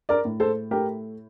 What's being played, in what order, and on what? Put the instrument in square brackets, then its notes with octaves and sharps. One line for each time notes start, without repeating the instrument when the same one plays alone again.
[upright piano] A#4 D5
A2
A4 C5
A3 G4 A#4